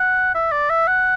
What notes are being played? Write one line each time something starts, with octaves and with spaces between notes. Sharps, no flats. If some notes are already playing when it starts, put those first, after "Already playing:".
Already playing: F#5
E5
D5
E5
F#5